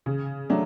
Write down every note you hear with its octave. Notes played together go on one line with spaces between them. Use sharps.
C#3
F#3 A3 D4